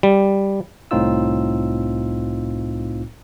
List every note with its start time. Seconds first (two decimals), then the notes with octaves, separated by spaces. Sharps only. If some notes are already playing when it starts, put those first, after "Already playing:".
0.03 G3
0.91 C2 A2 C4 D#4 F4 E6